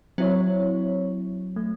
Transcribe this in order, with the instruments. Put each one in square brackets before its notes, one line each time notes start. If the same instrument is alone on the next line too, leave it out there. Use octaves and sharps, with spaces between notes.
[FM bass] F#3 [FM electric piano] C4 E4 C#5
[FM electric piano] A3